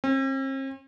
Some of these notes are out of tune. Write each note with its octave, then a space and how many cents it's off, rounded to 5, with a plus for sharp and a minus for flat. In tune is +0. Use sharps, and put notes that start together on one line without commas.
C4 +45